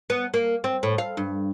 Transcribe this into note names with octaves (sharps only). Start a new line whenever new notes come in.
B3
A#3
C4
A2
F5
G2